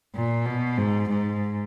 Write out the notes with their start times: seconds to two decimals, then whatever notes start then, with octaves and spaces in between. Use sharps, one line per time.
0.15 A#2
0.46 B2
0.77 G#2
1.09 G#2